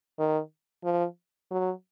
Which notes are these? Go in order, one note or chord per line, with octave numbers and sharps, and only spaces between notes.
D#3
F3
F#3